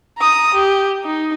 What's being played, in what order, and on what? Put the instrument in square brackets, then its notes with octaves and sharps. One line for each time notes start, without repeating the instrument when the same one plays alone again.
[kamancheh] A#5 D#6
G4
D#4